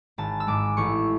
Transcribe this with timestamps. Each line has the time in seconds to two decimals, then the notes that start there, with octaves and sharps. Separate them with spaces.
0.18 G#1 A5
0.40 E6
0.47 G#2 G#3 D6
0.77 A1 C#6